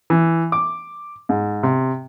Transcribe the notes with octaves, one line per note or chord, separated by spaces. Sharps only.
E3
D6
G#2
C3